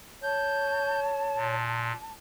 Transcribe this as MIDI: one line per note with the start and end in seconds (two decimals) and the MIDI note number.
0.22 1.55 73
0.22 2.11 81
0.22 1.00 91
1.35 1.93 46